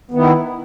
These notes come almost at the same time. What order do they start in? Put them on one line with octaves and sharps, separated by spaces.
B3 D#3 E4